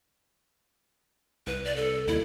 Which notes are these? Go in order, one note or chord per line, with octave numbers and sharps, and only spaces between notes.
C2 B4
D5
A4
D#2 E4